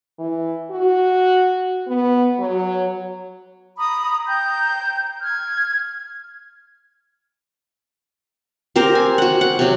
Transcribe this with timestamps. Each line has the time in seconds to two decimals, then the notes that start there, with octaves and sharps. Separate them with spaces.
0.19 E3
0.71 F#4
1.88 B3
2.39 F#3
3.77 A#5 B5 D#6
4.27 G5 A#5 G6
5.23 F6 G#6
8.76 C4 G4 A#4 C5
8.95 G#5
9.18 F#4 F#5
9.41 F#5
9.59 C3 F#3